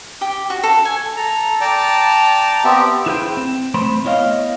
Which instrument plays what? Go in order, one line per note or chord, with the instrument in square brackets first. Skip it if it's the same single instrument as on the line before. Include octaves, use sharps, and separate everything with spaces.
[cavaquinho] G4
F#4
A4
G#5
[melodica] A4 A#5
D5 G5 A5 A#5
B3 C4 G4 E5
[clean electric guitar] E4 G#4 B4 C5 E5 G5
C4
A3 C4 C5 B5 C6
B3 E4 C#5 D#5 F5